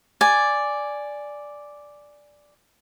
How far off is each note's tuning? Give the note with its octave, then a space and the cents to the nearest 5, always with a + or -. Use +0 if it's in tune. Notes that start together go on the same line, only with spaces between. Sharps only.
D5 +0 G#5 +0